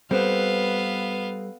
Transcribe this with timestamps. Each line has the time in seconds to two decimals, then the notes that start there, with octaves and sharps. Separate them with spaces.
0.11 G3 B3 C4 A4 B4 F5